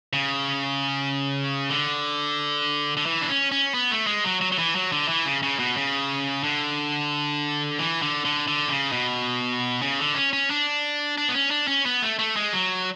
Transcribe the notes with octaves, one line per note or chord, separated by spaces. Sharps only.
C#3
D3
D3
E3
D4
C#4
C#4
B3
A3
G#3
F#3
F#3
F#3
E3
F#3
D3
E3
C#3
C#3
B2
C#3
D3
E3
D3
D3
D3
C#3
B2
C#3
D3
C#4
C#4
D4
D4
B3
C#4
D4
C#4
B3
A3
A3
G#3
F#3